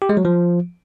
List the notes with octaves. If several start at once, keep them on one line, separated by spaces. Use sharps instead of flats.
G4
G#3
F#3
F3